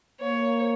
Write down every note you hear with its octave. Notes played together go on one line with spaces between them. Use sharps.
A#3 C#5